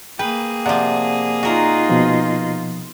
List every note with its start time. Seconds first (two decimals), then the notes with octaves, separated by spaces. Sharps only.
0.19 A#3 G#4 B4 G5
0.66 C3 F3 D5 F#5
1.43 D#4 F4 F#4 A#4
1.89 B2 F3